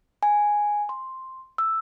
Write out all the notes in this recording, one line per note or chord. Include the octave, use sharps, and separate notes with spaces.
G#5
C6
E6